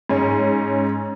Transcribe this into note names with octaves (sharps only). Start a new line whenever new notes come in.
G#2 C#4